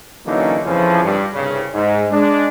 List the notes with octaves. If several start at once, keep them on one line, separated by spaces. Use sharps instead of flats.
D3 E3 F#3 A#3 C#4 D#4
F2 C#3 E3 F3
G2
C2 G2 C#3
G#2
G#3 D4